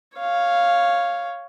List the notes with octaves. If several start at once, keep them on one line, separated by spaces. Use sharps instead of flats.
C#5 F5